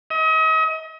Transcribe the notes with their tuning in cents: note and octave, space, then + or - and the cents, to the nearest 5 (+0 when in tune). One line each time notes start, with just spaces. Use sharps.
D#5 +40